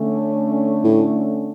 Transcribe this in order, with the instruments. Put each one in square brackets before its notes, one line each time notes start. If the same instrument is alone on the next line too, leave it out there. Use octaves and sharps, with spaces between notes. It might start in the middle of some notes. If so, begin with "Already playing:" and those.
Already playing: [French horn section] D3 A3 C#4
[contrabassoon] A2